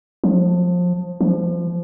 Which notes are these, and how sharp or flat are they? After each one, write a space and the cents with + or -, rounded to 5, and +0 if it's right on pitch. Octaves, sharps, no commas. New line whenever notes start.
F3 +25
F3 -20